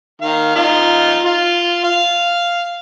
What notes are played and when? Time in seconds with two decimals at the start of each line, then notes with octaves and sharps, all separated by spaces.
0.21 D#3 F5
0.55 D#4 F4
1.25 F4
1.84 F5